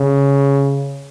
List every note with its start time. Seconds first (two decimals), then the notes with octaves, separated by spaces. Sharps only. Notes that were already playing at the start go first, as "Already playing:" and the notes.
Already playing: C#3